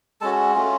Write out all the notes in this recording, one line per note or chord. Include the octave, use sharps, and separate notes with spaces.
G#3 C#4 F#4 A4 A5
A3 C#4 F4